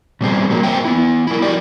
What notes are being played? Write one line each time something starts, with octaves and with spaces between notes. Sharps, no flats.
B2 G3 C4 G#4
F#3 G3 A#3
A#3 C4 E5 G5 G#5
B3 E4
E4 A#4
F#4 G4 A#4 D5